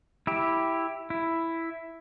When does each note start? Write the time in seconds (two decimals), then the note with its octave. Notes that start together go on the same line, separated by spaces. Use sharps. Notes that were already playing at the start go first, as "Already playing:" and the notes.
0.27 E4 G4
1.10 E4